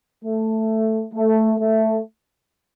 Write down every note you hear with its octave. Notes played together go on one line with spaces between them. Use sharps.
A3
A3
A3